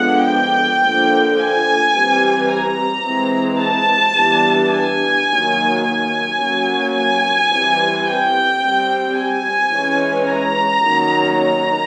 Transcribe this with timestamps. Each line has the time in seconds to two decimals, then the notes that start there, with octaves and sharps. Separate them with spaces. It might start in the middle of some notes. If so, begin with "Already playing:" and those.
Already playing: D3 F3 G#3 B3 D4 F#5
0.28 G5
0.83 D3 F3 A#3
1.39 G#5
1.95 E3 G3 C4
2.50 A#5
3.06 E3 G#3 C4
3.61 A5
4.17 E3 G3 B3 D4
4.73 G#5
5.28 D#3 F#3 A#3
5.84 G#5
6.39 F#3 A#3 C#4
6.95 G#5
7.50 E3 G3 C4
8.06 G5
8.61 G3 C4
9.17 G#5
9.72 E3 G#3 C#4
10.27 A#5
10.83 D#3 F#3 A#3 C#4
11.39 A#5